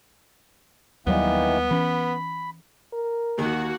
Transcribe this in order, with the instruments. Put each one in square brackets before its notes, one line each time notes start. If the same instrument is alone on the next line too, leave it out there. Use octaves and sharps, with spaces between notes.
[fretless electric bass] D#2 F#3 G3 [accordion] D#3 E3 A#3 [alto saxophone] B3
[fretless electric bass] E3 C#4 [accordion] B5
[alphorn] A#4
[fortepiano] D#2 D#3 [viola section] A#3 F#4 F#5